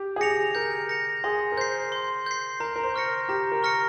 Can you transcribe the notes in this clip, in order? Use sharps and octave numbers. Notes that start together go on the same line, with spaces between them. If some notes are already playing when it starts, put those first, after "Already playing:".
Already playing: G4
G#4
G4 A#6 C#7 F7
A#4 G6
A#6 C#7 F7
G#4 C6
A#4
C5 G6 C7
C6
G6 C7
A#4 A#5
A#4
C5
C#6 F6 A#6 C#7
G4 A#5
A#4
C#6 F6 A#6 C#7